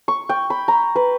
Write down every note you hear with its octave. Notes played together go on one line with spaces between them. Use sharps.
C#6
G5
B5
A#5
B4